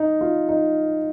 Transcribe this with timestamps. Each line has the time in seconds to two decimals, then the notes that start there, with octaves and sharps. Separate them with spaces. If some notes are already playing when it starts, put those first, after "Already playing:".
Already playing: D#4
0.21 F4
0.49 D#4